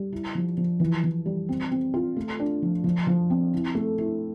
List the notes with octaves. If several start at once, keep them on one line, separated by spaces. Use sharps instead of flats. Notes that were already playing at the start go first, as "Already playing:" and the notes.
Already playing: G3
E4
F3
F3
E3
E3
G3
C4
C4
F4
A3
D4
F3
F3
F3
C4
E4
A3
E4